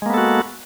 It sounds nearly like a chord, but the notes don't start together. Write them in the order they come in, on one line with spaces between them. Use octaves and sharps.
G#3 A#3 B3 A4 F#4